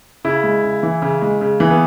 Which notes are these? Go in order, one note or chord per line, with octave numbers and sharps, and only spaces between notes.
C#3 E4
G#3
C#3
E3
C#3
G#3
C#3
E3
B3